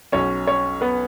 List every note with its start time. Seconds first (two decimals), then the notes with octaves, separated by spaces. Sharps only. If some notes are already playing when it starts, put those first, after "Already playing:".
0.12 B1 B2 C#4 C#5
0.47 C#4 C#5
0.81 B3 B4